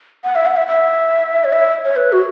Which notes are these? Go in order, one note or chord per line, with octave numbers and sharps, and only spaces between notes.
F#5
E5
F#5
E5
E5
C#5
E5
C#5
B4
F#4